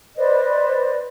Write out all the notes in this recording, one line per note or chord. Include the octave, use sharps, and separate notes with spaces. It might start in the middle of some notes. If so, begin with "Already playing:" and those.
B4 C5 D5 D#5